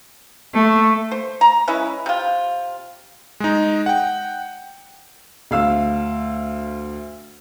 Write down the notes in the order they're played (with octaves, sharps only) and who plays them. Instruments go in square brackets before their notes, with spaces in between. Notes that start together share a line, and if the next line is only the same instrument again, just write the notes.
[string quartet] A3
[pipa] C5
A#5
G#3 C#4 E4 B4
C3 F4
[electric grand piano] G#3 D#4
F#5 G5
[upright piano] D2 F5 E6